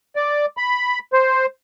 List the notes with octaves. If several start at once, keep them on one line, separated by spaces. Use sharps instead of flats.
D5
B5
C5